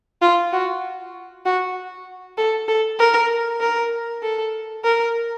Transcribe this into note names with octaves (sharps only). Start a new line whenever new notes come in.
F4
F#4
F#4
A4
A4
A#4
A#4
A4
A#4